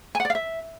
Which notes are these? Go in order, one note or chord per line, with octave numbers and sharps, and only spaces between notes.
G#5
F#5
D5
F5
E5